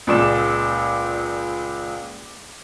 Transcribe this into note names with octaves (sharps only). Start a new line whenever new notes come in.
C#2 A#2 D5 D6 E7